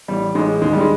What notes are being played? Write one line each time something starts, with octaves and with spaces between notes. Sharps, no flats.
A1 G3
A1 G#3
D#2 G#3
G3
G#3